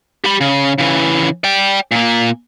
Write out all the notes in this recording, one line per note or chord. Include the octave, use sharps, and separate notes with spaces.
G4 B5
C#3
C#3 E3
D5 G5
A#2 A#3